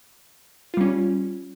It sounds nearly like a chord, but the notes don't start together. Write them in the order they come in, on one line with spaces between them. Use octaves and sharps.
F4 G3 C#4